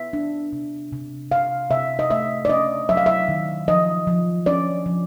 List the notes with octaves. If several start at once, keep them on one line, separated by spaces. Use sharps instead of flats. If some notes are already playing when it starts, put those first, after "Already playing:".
Already playing: B3 E5
D4
C3
C3
C3 F5
C3 E5
D#5
A3 E5
D5
C#4 D#5
F#3 E5
F5
E5
D#3
F3 D#5
F3
C#4 D5
F3